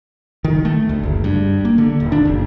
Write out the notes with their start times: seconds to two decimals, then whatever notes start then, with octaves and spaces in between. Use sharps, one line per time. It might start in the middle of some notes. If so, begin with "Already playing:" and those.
0.44 D#3
0.65 A3
0.89 D2
1.03 F#1
1.24 G2
1.65 A#3
1.78 D3
2.00 D#1
2.12 D4
2.25 F#1